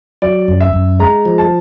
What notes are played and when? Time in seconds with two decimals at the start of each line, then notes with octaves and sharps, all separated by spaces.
0.22 F#3 D5
0.48 F#2
0.61 E5
0.73 F#2
0.99 G#3 A#5
1.25 F3
1.38 A5